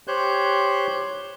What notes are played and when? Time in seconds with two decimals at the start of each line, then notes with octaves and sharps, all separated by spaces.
0.08 G4 C5 C#5 F#6 G6